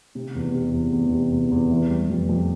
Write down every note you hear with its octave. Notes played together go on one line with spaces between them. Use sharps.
C3
E2
C3
E2
E2
C3
E2
E2
E3
G3
F2
F2